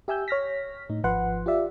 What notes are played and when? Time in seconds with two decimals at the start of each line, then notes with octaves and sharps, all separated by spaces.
0.08 G4 E5 G#5 E6 G6
0.28 C#5 F6 A#6 B6
0.89 A2 D#4
1.04 G#1 F3 B4 F#5 C6
1.46 F4 G4 D5 E5